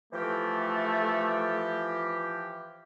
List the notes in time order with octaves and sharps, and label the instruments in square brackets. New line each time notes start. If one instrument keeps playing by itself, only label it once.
[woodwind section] E3 F3 G4 [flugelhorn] A3